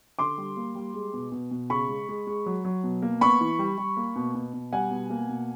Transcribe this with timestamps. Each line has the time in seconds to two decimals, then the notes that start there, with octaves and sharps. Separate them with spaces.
0.19 D3 C6 D6
0.38 G3
0.57 A#3
0.75 G3
0.94 G#3
1.14 B2
1.32 B2
1.51 B2
1.70 C#3 B5 C#6
1.89 G#3
2.09 G#3
2.27 G#3
2.46 F#3
2.65 F#3
2.84 B2
3.02 A#3
3.21 B3 B5 C#6
3.41 E3
3.59 G3
3.78 G3
3.97 A#3
4.16 B2
4.35 B2
4.53 B2
4.73 G3 F#5 G#5
4.91 B2
5.10 A#3
5.29 B2